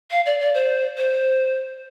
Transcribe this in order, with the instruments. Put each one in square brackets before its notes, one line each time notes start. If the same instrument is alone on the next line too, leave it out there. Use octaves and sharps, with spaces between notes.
[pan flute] F5
D5
D5
C5
C5